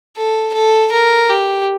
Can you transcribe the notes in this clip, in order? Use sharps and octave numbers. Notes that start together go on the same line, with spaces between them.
A4
A4
A#4
G4